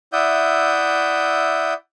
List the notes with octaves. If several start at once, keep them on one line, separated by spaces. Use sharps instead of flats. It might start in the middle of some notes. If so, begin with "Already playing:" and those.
E4 D5 E5 F#5 D#6 G6